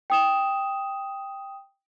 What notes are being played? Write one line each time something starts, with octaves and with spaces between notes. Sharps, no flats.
G5 D#6 E7